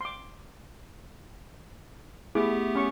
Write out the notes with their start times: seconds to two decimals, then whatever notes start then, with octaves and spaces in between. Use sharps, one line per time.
0.01 C6 D6
2.35 A3 B3 E4 G4 G#4 D6
2.75 C#4 C#6